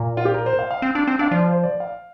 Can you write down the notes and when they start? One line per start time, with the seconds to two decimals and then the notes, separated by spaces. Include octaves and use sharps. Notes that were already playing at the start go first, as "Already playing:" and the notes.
Already playing: A#2
0.17 F4
0.25 G4
0.34 A#4
0.46 C5
0.59 F5
0.71 F5
0.82 C4
0.95 D4
1.07 C4
1.19 D4 F5
1.31 F3 D5
1.48 C5
1.63 D5
1.80 F5